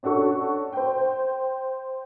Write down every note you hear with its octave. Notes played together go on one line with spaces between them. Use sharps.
C#4 D4 F#4 A4 C#6
C5 G5